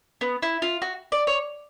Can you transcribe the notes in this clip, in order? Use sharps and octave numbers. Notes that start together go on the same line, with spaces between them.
B3
E4
F4
F#4
D5
C#5